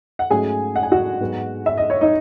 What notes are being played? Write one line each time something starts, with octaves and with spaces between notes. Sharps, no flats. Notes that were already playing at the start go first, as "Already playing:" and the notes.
F#5
G#2 F#3 A3 C#4 G#4 G#5
F#5
G#5
F#4 F#5
G#2 F#3 B3
E5
D#5
C#5
D#4 D#5